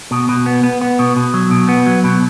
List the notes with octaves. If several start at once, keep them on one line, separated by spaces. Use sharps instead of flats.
B2
B2
B3
B3
B3
B2
B2
F#3
B2
B3
F#3
B2